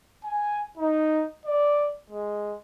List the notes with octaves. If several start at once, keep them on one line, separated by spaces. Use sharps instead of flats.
G#5
D#4
D5
G#3